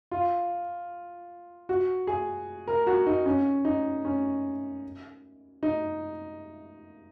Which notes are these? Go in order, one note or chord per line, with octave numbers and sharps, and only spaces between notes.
F4
F#4
G#4
A#4
F#4
D#4
C#4
D#4
C#4
D#4